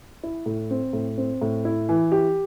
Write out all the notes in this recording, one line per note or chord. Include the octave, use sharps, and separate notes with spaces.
E4
A2
C4
A2
C4
A2
E4
E3
G4